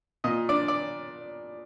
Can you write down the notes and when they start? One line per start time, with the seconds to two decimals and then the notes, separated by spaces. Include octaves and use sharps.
0.24 A#2 D#5
0.49 D4 D5
0.68 D5